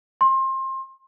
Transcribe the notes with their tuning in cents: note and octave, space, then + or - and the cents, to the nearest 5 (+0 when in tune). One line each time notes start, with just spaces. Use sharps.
C6 +25